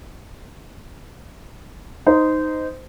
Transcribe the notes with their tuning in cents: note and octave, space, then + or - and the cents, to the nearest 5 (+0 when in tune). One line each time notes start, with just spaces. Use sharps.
D#4 +0 C5 -20